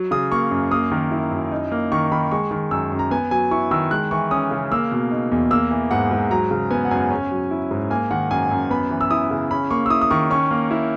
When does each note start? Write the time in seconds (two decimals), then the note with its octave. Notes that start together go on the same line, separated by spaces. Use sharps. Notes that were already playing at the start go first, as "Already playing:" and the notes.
Already playing: F#3
0.11 C#3 D#6
0.32 A#3 C#6
0.51 F#2
0.71 A#3 D#6
0.92 D#3
1.11 E4
1.31 F#2
1.51 D#4
1.72 A#3
1.92 D#3 C#6
2.11 D#3 B5
2.32 G#3 C#6
2.51 D#3
2.71 F#2 E6
2.92 F#2
2.99 A#5
3.11 B3 G#5
3.31 F#3 G#5
3.51 E4 C#6
3.71 D#3 E6
3.91 G#3 F#6
4.11 E3 C#6
4.31 C#4 D#6
4.51 C#3
4.72 A#3 E6
4.91 B2
5.11 D#4
5.31 E2
5.51 A#3 E6
5.71 E3
5.91 G#2 F#5
6.11 G#2
6.31 F#3 A#5
6.51 C#3
6.71 B3 G#5
6.85 F#5
6.91 F#2 G#5
7.11 C#4
7.31 F#3
7.51 E4
7.71 G#2
7.90 A#3 G#5
8.11 D#3 F#5
8.31 F#2 G#5
8.51 F#2
8.70 B3 B5
8.91 E3
9.01 E6
9.11 E4 D#6
9.31 C#3
9.51 C#4 B5
9.71 A#3 C#6
9.86 E6
9.90 E4 D#6
10.01 D#6
10.11 D#3 C#6
10.30 C#4 C#6
10.51 A#3
10.71 E4